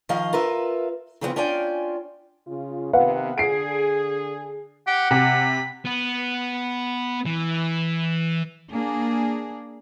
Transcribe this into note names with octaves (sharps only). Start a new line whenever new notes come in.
D#3 F3 D#5 F5
F4 A#4 B4 E5
C#3 E3 F3 G#3 B3 C4
C#4 D4 F4 G5 G#5
C#3 F4
C3 D#3 B3 B4 F5 F#5
D3 G#4 C7 D7
G4 F#5
C3 B5
B3
E3
A#3 D4 G#4